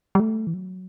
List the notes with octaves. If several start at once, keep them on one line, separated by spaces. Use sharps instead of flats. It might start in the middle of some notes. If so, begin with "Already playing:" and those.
G3
A3
E3
F#3